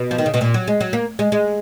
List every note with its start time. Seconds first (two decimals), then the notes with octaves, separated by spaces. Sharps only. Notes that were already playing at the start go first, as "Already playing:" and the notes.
Already playing: B2
0.11 F3
0.18 D#3
0.26 C#3
0.34 B2
0.41 A#2
0.54 F#3
0.68 G#3
0.81 F#3
0.93 A#3
1.19 G#3
1.32 G#3